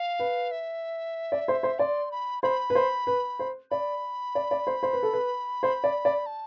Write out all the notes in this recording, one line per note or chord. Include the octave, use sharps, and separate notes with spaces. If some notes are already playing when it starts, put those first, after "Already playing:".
Already playing: F5
B4
E5
D5
C5
C5
D5 C6
B5
C5 B5
B4
C5
B4
C5
D5 B5
D5
D5
C5
C5
B4
A4
B4
C5
D5
D5
A5